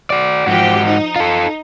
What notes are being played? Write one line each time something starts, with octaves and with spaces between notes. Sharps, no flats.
F#4 D5
G#2 F3 F#4 G4
D#4
F4 A4